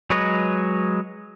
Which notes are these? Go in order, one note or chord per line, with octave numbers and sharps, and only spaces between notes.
F#3 G#3 B4 C#5 D#5